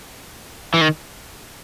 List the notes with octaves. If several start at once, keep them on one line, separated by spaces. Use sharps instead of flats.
E3
D#3